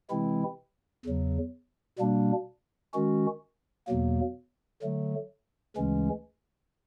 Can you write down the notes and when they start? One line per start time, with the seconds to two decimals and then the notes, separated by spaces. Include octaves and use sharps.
0.10 C3 E3 G#3 C4 E4
1.05 E2 C#3 F#3
1.99 B2 G3 A#3 D4
2.94 D#3 G#3 C#4 F#4
3.88 E2 B2 F#3 A#3
4.82 D3 F#3 A3
5.76 D2 C#3 E3 G#3 C#4